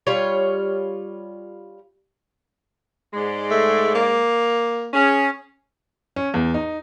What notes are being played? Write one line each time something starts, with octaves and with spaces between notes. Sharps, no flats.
G3 F4 C#5
G#2 G#3 D5
A3
A#3
C#4 G#4
C#4
E2
D#4